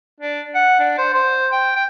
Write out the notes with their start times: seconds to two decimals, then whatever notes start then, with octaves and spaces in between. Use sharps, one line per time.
0.21 D4
0.55 F#5
0.80 D4
0.98 C5
1.14 C5
1.52 G5
1.76 G5